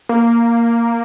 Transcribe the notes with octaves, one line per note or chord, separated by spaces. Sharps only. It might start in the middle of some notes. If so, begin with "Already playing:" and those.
A#3